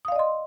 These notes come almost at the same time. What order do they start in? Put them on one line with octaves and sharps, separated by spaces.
D#6 F5 D5 D#5 C6